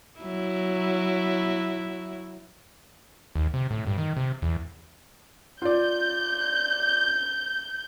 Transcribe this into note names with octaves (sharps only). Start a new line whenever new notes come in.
F#3 E4
D#2
C3
A2
G2
D#3
C3
E2
F4 D5 G6